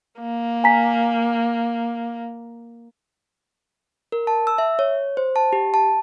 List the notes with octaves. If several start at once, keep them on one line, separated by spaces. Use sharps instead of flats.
A#3
G#5 A#5 B6
A#4
A5
E6
E5
C#5
C5
A5
G4
A5